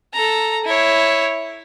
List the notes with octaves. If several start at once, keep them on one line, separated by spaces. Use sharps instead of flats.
A4 A#5
E4 C#5